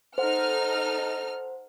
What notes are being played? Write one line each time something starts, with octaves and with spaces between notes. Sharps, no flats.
D#4 A4 C5 F#5 F6